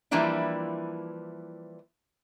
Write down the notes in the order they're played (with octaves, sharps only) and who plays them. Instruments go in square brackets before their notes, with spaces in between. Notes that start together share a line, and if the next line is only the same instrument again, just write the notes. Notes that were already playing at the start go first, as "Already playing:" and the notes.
[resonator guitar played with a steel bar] E3 F3 G3 A#3 D4 E4